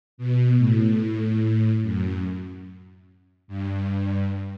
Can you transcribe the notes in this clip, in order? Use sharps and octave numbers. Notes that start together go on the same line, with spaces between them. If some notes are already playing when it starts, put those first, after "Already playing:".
B2
A2
F#2
G2